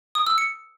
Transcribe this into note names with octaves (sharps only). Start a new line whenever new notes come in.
D#6
E6
C#7